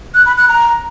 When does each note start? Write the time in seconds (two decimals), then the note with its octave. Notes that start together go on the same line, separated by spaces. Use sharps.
0.14 F#6
0.26 B5
0.37 F#6
0.49 A#5